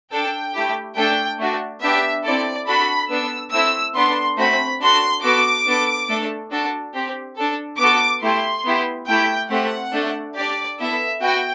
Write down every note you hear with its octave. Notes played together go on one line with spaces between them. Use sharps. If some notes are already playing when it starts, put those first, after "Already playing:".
D4 A4 G5
A3 E4 G4
A3 D4 A4 G5
A3 D4 F#4
B3 D4 G4 E5
C4 E4 A4 D5
D4 F#4 A4 B5
B3 D4 A4 E6
A3 C4 E4 E6
B3 D4 A4 C6
A3 C4 F#4 B5
D4 F#4 A4 C6
B3 F#4 A4 D6
B3 D4 A4
A3 D4 A4
D4 F#4 A4
C4 G4
D4 A4
B3 F#4 A4 D6
A3 E4 G4 C6
B3 E4 G4
A3 E4 G4 G5
A3 C4 G4 F#5
A3 D4 A4
D4 G4 D5
B3 E4 A4 E5
B3 F#4 G5